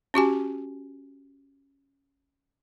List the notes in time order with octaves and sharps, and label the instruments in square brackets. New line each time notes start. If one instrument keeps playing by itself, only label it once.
[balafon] C#4 F#4 G4 G#5